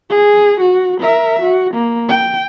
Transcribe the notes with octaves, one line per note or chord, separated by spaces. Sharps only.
G#4
F#4
A#4 E5
F#4
A#3
G5